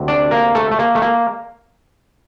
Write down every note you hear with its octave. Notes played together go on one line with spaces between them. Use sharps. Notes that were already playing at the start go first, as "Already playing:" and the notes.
Already playing: D2 C3 F#3
D4 D5
A#3 A#4
A3 A4
A3
A#3
A3
A#3